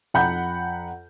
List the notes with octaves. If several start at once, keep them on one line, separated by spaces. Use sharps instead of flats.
F2 F#5 A#5 B5 G6